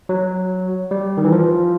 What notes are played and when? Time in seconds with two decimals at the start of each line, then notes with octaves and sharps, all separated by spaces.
0.09 F#3
0.91 G3
1.17 D#3
1.24 E3
1.32 F3